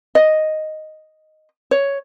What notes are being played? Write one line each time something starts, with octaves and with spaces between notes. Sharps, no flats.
D#5
C#5